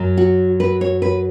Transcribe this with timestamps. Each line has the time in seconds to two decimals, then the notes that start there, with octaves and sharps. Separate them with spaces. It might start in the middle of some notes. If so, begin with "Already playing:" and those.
Already playing: F#2 F#3
0.17 F#4
0.60 B4
0.81 C#5
1.02 B4